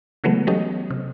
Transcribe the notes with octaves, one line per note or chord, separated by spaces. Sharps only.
C#3 E3 F#3 G#3 A3 B3
F#3 B3 C#4 G4 A4 D#5
C3